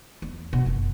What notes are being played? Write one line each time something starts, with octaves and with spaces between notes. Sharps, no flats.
E2
B2
F#1